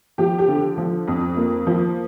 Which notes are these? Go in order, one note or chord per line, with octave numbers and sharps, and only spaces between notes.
F3 G4
G4
D3
F3
F2
A#3
F3